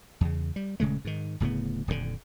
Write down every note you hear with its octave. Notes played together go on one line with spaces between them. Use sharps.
E2 C#3
G3
D#1 C#3 G#3 A3
G#2 D#3
D1 A2 C#3 B3
D#1 F2 G#2 D3